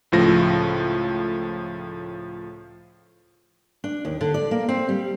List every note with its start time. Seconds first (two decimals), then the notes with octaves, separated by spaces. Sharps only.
0.12 C#2 A2 F3 A#6
3.84 D4
4.05 D#2
4.21 D3
4.34 D5
4.51 A#3
4.69 C4
4.89 G3